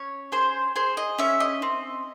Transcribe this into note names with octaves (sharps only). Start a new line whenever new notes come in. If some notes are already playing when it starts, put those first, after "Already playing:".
Already playing: C#4 C#5
G#4 C5
G#4 C5
D#5
C#4 E5
D#5
C4